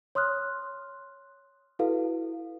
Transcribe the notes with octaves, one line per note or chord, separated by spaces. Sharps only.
C#5 C6 D#6 F6 F#6
E4 F#4 A4 B4 F5